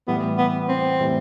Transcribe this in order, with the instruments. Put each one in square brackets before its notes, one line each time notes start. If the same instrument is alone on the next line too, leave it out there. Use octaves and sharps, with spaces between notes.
[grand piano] A2 E3 G3 [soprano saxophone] B3
[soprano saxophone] B3
C4
[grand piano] A2 E3 G3